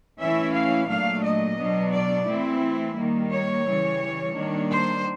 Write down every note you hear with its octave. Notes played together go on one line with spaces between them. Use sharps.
E3 A3 C#4 E4 E5
F5
A#2 F#3 A3 D4 F5
D#5
B2 F#3 B3 D4
D5
E3 A3 C4 E4
D#3 G3 A#3
C#5
C#3 E3 G3
D#3 G3 A#3 D4
C5